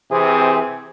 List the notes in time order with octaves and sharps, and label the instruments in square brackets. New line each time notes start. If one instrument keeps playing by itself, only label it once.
[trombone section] C3 E3 C4 G#4